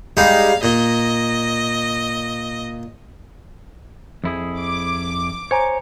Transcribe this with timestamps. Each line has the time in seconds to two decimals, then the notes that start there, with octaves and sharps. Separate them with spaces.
0.17 G3 G#3 D#4 F5
0.63 A#2 D#5
4.24 F2 E4 G#4
4.59 D6
5.51 C5 C#5 G#5 A#5